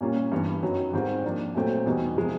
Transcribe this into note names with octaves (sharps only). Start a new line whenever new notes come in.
A#2 G3 A#3 C#4 F4
G2 E3 G3 B3
F#2 D#3 F#3 B3
G#2 D#3 G3 C4 F4
F3 A#3 D4
A#2 F#3 A3 C4
E2 B2 G3 B3 D#4
C3 F3 G#3